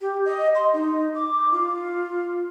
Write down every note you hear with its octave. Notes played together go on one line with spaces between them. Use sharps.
G4
D#5
C6
D#4
D6
F4